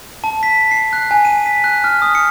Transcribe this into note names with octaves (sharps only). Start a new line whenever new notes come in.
A5
B6
C7
F#6
G#5
D#7
B6
F#6
F6
D#6
C#7